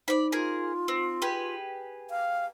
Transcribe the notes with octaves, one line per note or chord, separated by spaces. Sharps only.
D#4 C5 D5 B5
F4 G#4 A#4
C4
G4 G#4 B4
F5